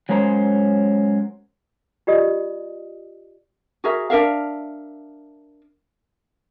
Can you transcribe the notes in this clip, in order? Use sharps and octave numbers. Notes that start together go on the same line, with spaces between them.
F#3 G#3 C#4 A#4 C5 A#5
F4 G4 D5 D#5 D#6
F#4 G#4 A#4 E5
D4 A#4 E5 F5